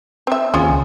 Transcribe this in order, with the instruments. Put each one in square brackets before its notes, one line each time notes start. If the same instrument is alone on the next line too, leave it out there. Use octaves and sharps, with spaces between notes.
[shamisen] C4 E5
[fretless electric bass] D#2 [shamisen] C#4 F4 G#4
[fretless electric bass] C#2